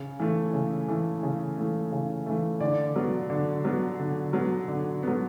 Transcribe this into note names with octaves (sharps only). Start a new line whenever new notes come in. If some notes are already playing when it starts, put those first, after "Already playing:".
Already playing: C#3
E3 A3
C#3
E3 A3
C#3
E3 A3
C#3
E3 A3
D3 D5
F#3 B3
D3
F#3 B3
D3
F#3 B3
D3
F#3 B3